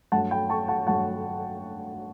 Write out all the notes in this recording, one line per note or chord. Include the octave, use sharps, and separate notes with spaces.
G2 F#3 A3 F#5 A5
G5 B5
A5 C#6
F#5 A5
G2 F#3 A3 F#5 A5